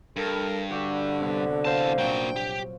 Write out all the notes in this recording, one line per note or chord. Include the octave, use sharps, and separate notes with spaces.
G2 A4 A#4
D3 F#4 G4 B4
C2 B3 B4
E2 A#4 C5 F5 A5
A#2 F#3 A#3 D4 F#4 G5
G4